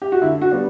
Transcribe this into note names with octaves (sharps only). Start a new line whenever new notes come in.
G4
F#4
D3 E4
F#4
G3 B3 D4